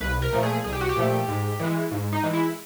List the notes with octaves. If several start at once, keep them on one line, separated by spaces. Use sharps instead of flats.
C2 B4
A#4
A#2 F3 A3
G#4
C2 G#4
G4
F#4
G4
A#2 F3 A3
G#2
E3 G#3
G#2
D#4
E3 G#3
E4